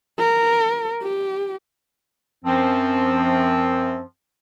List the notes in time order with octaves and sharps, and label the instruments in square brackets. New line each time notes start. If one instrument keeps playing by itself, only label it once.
[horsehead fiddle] A#4
G4
[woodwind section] F#2 F3 C4